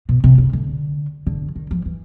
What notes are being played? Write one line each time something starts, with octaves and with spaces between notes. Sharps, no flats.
B2
C3
C#3
D3
D3
D#3
F3
E3